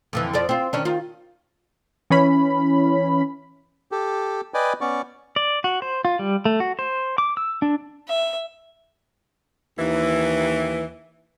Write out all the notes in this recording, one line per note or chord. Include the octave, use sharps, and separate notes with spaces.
F2 D3 E3
F2 F3 D5
C4 F4
D#3 C#4 D4
D#3 F4
E3 C#4 B5
G4 A4
B4 D5 D#5 G5 G#5
B3 C#4 D5 C#6
D5
F#4
C5
F4
G3
A3
F#4
C5
D6
E6
D4
E5
D#2 E3